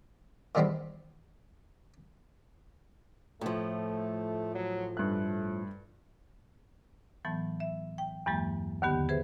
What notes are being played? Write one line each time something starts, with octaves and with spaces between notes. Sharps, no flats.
D#3 E3 G3 G#3 B3 C4
A2 F3 A3
F#3
G2 A3 F#6
A2 E3 F#3 B3 A5
E5
G5
E2 G2 E3 F#3 G#3 A#3
D#2 D3 D#3 B3 G4
G#4 B4 C5 E5